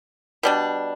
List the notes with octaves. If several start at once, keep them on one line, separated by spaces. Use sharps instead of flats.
B2 G3 D4